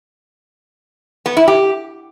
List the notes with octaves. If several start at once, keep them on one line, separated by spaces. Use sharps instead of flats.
B3
E4
G4